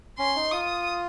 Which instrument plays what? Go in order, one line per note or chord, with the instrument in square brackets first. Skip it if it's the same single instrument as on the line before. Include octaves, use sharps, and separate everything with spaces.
[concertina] C#4 [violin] C6
[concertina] D#4
[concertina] F4 [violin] D#6